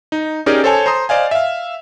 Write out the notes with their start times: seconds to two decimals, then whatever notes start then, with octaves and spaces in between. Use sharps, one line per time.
0.12 D#4
0.46 C#4 D#4 G4 G#4 A#4 D5
0.64 A4 C5 C#5 G#5 A5
0.86 C5 A#5 C6 D#6
1.09 C5 D5 D#5 F5 G#5
1.31 E5 F5